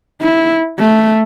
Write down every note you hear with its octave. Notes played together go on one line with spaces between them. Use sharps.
E4
A3